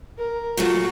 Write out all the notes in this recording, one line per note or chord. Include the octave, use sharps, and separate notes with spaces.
A#4
A#2 F#3 A3 F#4